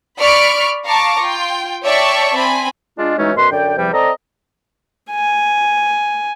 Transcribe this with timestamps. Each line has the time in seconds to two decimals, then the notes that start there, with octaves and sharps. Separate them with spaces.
0.18 D5 B5 C#6 F6 B6 D7
0.85 F5 A5 A#5 C#6 D6
1.19 F4 G5
1.83 C#5 D5 E5 G5 A5 C#6
2.35 C4 G#5 B5
2.98 G#3 D4 F4
3.18 E3 F#3 G#3 A3 C#4 D#4
3.37 F#2 B2 B4 C6
3.51 F#2 D3 D5 G5
3.77 E2 C3 F3 G3 G5
3.93 C4 A4 D5 D#5 A#5
5.11 G#5